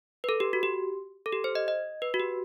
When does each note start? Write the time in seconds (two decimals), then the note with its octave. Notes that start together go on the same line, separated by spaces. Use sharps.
0.24 B4
0.29 A4
0.40 G4
0.53 F#4
0.63 G4
1.26 A4
1.33 G4
1.44 C5
1.55 D#5
1.68 D#5
2.02 B4
2.14 F#4
2.19 G4